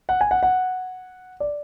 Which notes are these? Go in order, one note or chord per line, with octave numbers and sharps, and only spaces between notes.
F#5
G#5
F#5
F#5
D5